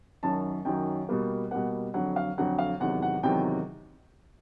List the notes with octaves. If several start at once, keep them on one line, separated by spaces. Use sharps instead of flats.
F#2 D#3 F#3 A5
F#2 D#3 F#3 G5
B2 G3 A#3
B2 G3 A#3 F#5
F2 D3 F#3 F#5
F5
F2 D3 F#3 F#5
F5
E2 C3 D#3 F#3 F#5
F#5
E2 C3 D#3 F#3 G5